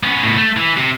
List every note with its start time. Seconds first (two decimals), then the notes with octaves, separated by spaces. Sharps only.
0.03 B3 C#4
0.24 A2 B3
0.37 A3
0.57 E3
0.78 C3